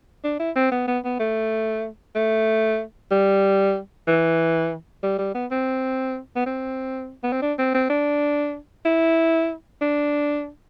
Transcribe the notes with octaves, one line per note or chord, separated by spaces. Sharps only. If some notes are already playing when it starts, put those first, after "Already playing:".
D4
E4
C4
B3
B3
B3
A3
A3
G3
E3
G3
G3
B3
C4
B3
C4
B3
C4
D4
C4
C4
D4
E4
D4